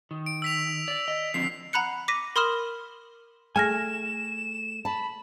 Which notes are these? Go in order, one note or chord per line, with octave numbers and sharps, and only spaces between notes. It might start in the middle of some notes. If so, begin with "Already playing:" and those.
D#3
D7
E6 B6 F7
D5
D#5
D3 F3 C4 C7
F#5 A#5 B5 F#6 C#7
D6 A#6 B6 D#7
A#4 B5 C6 D#6 F6 E7
A3 G#4 G#5 F6 A#6 E7
A5 B5